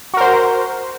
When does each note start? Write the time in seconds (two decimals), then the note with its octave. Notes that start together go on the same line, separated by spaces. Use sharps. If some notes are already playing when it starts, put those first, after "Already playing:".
0.14 F#4
0.17 A#4
0.21 C5